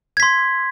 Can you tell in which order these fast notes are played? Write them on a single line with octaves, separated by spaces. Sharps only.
G#6 B6 C6